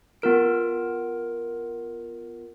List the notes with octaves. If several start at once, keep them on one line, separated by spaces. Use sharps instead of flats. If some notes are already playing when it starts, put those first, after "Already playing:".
B3 F4 A#4 D7